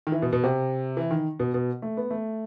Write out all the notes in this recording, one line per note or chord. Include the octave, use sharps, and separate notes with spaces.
D#3
E3
B2
B2
C3
E3
D#3
B2
B2
A3
B3
A3